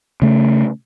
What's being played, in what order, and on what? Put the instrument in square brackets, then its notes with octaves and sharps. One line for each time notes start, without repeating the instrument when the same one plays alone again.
[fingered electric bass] C#3 A3